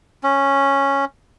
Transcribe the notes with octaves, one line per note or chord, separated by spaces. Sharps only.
C#4